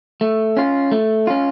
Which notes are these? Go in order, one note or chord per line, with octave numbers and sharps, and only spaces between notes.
A3
C#4 F4
A3
C#4 F4